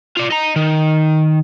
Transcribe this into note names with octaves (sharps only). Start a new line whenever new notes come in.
F4 D5
D#5 A#5
D#3